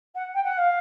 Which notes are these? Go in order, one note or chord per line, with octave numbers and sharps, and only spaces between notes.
F#5
G5
F#5
F5